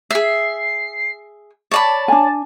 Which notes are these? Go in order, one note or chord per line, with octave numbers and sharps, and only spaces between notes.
G#4 E5 C7
C#5 D5 A5 B5
D4 G#5